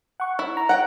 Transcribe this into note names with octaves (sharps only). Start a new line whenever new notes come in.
F#5 C#6
E4
A#5
F#5 G5